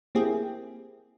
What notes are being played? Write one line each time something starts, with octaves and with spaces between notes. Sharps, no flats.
A#3 C4 E4 G4 G#4